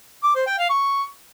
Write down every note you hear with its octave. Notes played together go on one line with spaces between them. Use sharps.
D6
C5
G5
F5
C#6